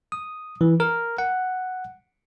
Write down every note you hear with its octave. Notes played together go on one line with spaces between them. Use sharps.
D#6
E3
A#4
F#5